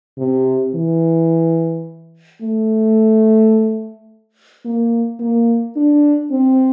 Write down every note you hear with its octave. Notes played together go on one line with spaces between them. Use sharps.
C3
E3
A3
A#3
A#3
D4
C4